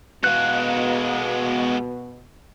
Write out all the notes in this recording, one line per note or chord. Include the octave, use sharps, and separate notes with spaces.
B2 G#3 B3 F#4 F5 F#6